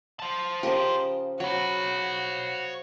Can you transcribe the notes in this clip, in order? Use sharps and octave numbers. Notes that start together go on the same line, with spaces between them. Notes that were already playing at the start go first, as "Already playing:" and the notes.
C5 A5
C#3 F3 G4 A#4 D#5
F#3 F#4 C#5 B5